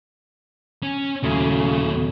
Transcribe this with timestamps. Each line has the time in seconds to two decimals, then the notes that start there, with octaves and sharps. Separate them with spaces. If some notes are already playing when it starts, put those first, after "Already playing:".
0.83 C#4
1.23 D#2 A#2 C#3 F#3 A3 E4